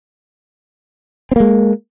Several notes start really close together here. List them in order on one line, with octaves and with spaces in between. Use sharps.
C4 A#3 G#3